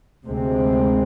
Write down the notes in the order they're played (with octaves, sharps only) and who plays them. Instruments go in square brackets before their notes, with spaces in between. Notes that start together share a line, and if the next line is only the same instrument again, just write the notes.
[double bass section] D2 C3 G#3 C4